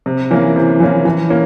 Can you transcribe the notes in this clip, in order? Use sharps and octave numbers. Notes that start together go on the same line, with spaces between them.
C3
E3 A#3 C#4
C3
E3 A#3 C#4
E3
A#3 C#4